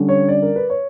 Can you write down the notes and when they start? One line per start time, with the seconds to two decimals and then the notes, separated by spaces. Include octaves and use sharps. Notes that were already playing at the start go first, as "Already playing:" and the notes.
Already playing: D3 G3 C#4
0.09 C#5
0.28 D5
0.42 A#4
0.56 B4
0.70 C#5